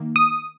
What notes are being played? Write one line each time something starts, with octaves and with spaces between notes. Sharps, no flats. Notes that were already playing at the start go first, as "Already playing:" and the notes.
Already playing: D#3 A#3
D#6